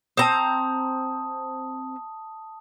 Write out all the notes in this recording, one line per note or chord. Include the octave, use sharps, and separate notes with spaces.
C4 A5 A#5 D#6